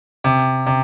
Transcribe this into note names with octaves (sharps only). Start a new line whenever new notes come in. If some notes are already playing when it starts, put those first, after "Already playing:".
C3
C3